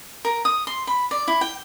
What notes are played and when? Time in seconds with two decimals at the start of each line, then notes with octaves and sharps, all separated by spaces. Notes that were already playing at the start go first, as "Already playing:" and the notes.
0.25 A#4
0.45 D#6
0.67 C6
0.87 B5
1.11 D5
1.28 E4
1.41 G5